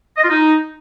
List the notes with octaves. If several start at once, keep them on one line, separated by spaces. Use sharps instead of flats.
D#5
F4
D#4